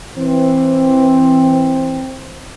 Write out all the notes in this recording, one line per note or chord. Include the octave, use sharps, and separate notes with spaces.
E3 C4